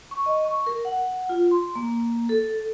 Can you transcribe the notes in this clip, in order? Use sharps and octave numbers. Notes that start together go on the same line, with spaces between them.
C#6
D#5
C#6
A#4
F#5
F4
C6
A#3
A4